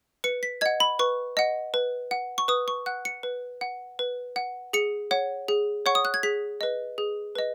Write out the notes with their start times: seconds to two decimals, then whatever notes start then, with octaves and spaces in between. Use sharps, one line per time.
0.24 B4 C#7
0.43 B6
0.61 D#5 F#5 G#6
0.80 B5
0.99 B4 C#6
1.37 D#5 F#5
1.74 B4
2.11 F#5
2.38 C#6
2.48 B4 D#6
2.68 C#6
2.86 F#5 F#6
3.05 C#7
3.23 B4
3.61 F#5
3.99 B4
4.36 F#5
4.73 G#4 C#7
5.11 C#5 F#5
5.48 G#4
5.86 C#5 F#5 C#6
5.95 D#6
6.05 F#6
6.14 G#6
6.23 G#4 B6
6.61 B4 D#5
6.98 G#4
7.35 B4 D#5